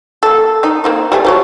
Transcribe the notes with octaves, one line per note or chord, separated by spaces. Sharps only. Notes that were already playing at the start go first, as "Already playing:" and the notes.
A#3 A4
D#3 D#4
A#3 C4 D#4
G3 A3 G#5
F3 F#4 C#5